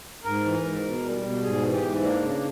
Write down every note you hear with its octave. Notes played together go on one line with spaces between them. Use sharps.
G#2 A#4
E3
G#2
B2
G3
B2
G#2 G#4
E3
G4
G#2
A#3 D4
C#3